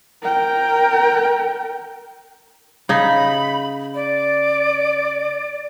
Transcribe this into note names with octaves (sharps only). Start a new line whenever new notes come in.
A#4 G5
C#3 D#4 B5
D5